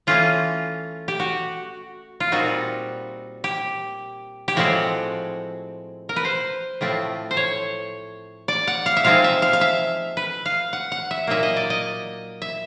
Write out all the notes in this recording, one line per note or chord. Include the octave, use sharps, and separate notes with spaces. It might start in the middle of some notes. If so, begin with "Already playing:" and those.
E3 A3 C#4 F4
G4
F#4
F4
A#2 G3 C4 D#4 F#4
G4
G4
A2 F3 G#3 C4 F#4
A#4
B4
C5
A2 F3 A3 C4
C5
C#5
D5
F#5
F5
E5
F3 G#3 C4 D#4 F5
E5
F5
F5
E5
B4
F5
F#5
F#5
E5
A#2 F#3 A#3 D#4 E5
D#5
D5
D#5
E5